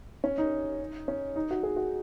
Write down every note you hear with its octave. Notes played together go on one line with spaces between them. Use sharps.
C#4
D#4
C#4
D#4
F#4
G#4
F#4